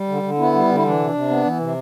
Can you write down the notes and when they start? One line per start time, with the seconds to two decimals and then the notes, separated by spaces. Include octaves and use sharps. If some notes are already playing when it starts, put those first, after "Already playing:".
Already playing: G3
0.08 D3
0.23 D3
0.38 B3 E4
0.53 G3
0.69 D3 E4
0.84 E3 D4
0.99 C3
1.14 C3
1.29 B3
1.45 E3
1.60 C3